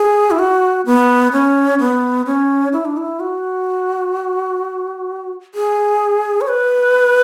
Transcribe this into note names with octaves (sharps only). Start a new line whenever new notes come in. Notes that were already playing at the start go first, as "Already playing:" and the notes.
Already playing: G#4
E4
F#4
B3
C#4
B3
C#4
E4
D4
E4
F#4
G#4
C#5
B4